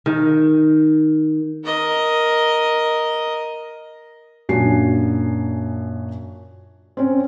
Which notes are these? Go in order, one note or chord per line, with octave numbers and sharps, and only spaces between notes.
D#3
A#4 D#5
F#2 A#2 D4 F#4 G#5 C7
C4 C#4